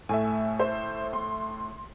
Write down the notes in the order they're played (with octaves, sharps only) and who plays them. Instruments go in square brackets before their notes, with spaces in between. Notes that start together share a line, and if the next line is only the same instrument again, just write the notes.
[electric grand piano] A2 A3 E5 [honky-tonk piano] G#5
[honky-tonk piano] C5
C6